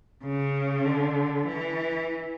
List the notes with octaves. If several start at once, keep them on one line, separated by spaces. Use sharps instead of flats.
C#3
D3
E3